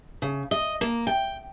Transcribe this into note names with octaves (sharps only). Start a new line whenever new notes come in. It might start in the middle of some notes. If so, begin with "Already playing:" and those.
C#3
D#5
A#3
G5